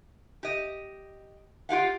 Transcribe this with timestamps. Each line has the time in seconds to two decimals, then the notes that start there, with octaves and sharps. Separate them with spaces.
0.43 G4 D#5
1.69 F4 G4 F5 F#5